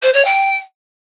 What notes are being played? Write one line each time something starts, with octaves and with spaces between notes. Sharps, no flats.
C5
C#5
G5